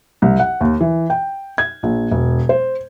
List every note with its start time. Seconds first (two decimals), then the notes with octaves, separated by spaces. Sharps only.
0.22 C2
0.39 F#5
0.61 D#2
0.80 E3
1.10 G5
1.58 G#6
1.83 A#1
2.11 E1
2.49 C5